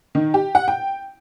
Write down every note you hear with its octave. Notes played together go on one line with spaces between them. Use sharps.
D#3
G4
F#5
G5